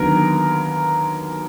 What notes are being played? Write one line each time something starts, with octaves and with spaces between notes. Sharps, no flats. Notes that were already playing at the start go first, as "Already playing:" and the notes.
Already playing: D#2 D3 F#3 B3 A#4